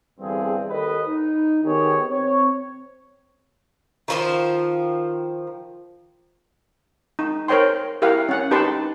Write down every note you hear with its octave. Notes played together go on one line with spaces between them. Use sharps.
E2 G2 D3 C4 G#4
D#2 A4 B4 D#5
D#4
D#3 B3 G4 G#4 C#5
C4 C#5
D#3 F3 C5
D#4
A#4 C5 C#5 G5 C6
E4 G4 A#4 F5 F#5
C#4 F#5
D#4 G4 B4 A5 C6